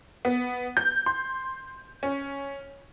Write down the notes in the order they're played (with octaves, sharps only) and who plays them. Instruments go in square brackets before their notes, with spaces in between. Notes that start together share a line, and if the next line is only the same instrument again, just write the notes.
[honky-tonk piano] B3
G6
C6
C#4